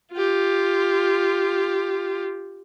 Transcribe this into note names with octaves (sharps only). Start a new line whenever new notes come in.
F4 G4